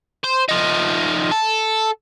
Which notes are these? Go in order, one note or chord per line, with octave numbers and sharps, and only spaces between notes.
C5
F3 D#4
A4